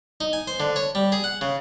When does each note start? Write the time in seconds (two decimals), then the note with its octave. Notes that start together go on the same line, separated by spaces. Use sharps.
0.21 D#4
0.33 G#5
0.47 C5
0.60 D3
0.76 C#5
0.95 G3
1.12 G#4
1.24 F#5
1.41 C#3